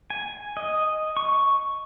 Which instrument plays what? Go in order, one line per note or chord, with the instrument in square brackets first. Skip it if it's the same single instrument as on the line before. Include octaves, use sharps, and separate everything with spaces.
[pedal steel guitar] G#5
D#5
C#6